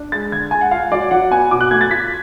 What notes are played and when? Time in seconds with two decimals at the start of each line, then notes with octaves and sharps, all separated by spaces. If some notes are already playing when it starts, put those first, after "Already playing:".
Already playing: D4
0.12 G#3 A6
0.32 D3 G#6
0.51 G#3 G#5
0.61 F#5
0.71 F4 F5
0.91 F#3 D5
1.11 F#3 F#5
1.31 B3 G#5
1.51 B2 D6
1.61 F#6
1.71 A3 G#6
1.81 A6
1.91 F4 B6